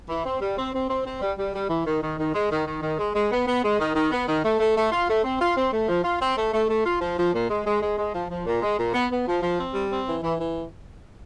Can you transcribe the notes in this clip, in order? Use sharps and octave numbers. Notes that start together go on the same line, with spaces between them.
E3
C4
G3
C4
C4
C4
C4
G3
G3
G3
E3
D#3
D#3
D#3
G#3
D#3
D#3
D#3
G#3
G#3
B3
B3
G#3
D#3
D#3
B3
D#3
A3
A3
A3
F4
A3
C4
F4
C4
A3
F3
F4
C4
A3
A3
A3
F4
F3
F3
A#2
G#3
G#3
G#3
G#3
F3
F3
A#2
G#3
A#2
B3
B3
F3
F3
C4
G3
C4
E3
E3
E3